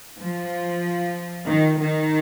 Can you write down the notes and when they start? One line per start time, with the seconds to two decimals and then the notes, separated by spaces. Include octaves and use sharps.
0.19 F3
1.48 D#3
1.80 D#3